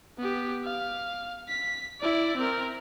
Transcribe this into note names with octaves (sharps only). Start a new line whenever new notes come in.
B3 G4
F5
B6
E4 D5
C4 A#4